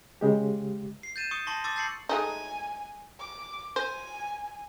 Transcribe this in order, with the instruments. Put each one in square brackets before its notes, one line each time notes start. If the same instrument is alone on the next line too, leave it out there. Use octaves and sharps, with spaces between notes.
[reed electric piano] C#3 G#3 G4
[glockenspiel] C7
G6 A6 D#7 E7
C#6 D#6 C#7
A5 C6 C#6 A#6
C6 D6 E6 A6
A5 G6 C7 C#7 F#7
[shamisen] G#3 A3 D#4 [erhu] G#5
[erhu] D6
[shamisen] C5 [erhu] G#5